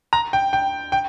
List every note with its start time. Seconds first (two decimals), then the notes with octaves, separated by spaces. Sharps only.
0.13 A#5
0.33 G5
0.53 G5
0.92 G5